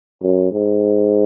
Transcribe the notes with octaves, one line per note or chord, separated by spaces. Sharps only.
F#2
G#2